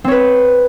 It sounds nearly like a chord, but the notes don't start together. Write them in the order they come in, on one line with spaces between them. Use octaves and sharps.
C4 C#5 B4